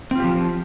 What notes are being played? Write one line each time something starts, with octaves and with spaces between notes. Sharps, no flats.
F3 C4 F4 G4